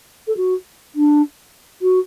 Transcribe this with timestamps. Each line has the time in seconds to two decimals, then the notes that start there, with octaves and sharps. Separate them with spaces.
0.27 A4
0.37 F#4
0.95 D4
1.82 F#4